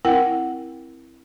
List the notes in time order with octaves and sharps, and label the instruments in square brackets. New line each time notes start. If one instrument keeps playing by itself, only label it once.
[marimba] C4 E4 A#4 F#5 G5